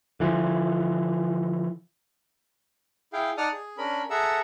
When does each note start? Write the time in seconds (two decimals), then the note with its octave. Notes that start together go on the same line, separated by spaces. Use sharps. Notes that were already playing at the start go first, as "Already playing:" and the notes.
0.20 D3 E3 F3
3.13 E4 G#4 F5 G5
3.37 D#4 D5 F#5 A5 D#6 F6
3.53 G#4
3.78 C#4 D4 A#4 B5
4.10 G#4 A4 E5 F#5 A#5 E6